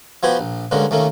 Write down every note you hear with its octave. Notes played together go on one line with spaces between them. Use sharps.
F3 B3 F#4 G4 G#5 B5
A#1
G2 D3 G#3 A#3 C#4
D#2 A3 A#3 C#4